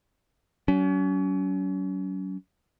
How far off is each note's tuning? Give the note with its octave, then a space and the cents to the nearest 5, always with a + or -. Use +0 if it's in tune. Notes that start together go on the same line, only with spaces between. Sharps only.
F#3 +35 C#4 +35